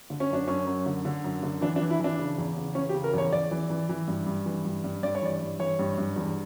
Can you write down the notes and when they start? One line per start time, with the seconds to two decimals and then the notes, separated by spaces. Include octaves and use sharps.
0.10 D3
0.20 C#4
0.30 F#2 D4
0.47 F#2 C#4
0.67 F#2
0.86 D3
1.05 D3
1.24 F#2
1.43 D3
1.61 E3 D4
1.76 D4
1.81 E3
1.90 E4
2.00 E3 D4
2.19 C#3
2.38 E2
2.57 C#3
2.75 E3 C#4
2.89 G4
2.94 C#3
3.04 A#4
3.14 E2 C#5
3.33 E2 D5
3.51 E3
3.70 E3
3.89 E3
4.08 G2
4.26 G2
4.46 E3
4.65 G2
4.84 G2
5.03 G2 D5
5.15 C#5
5.22 E3 D5
5.41 G2
5.59 E3 C#5
5.79 G2
5.98 G2
6.16 E2